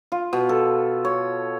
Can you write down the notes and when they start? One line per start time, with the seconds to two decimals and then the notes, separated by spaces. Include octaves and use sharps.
0.12 F4
0.33 B2
0.49 A4
1.05 C#5